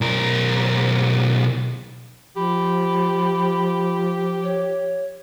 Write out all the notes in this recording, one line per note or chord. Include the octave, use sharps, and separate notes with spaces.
B1 A#4
F3 G4 B5
C#5